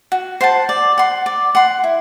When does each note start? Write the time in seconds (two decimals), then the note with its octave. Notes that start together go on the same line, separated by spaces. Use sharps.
0.12 F#4
0.41 C5 F#5 A5
0.69 D5
0.98 F#5 C6
1.26 D5
1.55 F#5 C6
1.84 E4